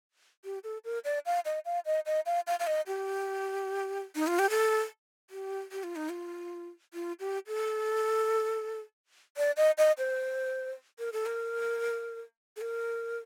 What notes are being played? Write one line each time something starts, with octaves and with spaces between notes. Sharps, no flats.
G4
A4
A#4
D5
F5
D#5
F5
D#5
D#5
F5
F5
F5
D#5
G4
D#4
F4
G4
A4
G4
G4
F4
D#4
F4
F4
G4
A4
D5
D#5
D#5
C5
A#4
A4
A#4
A4
A#4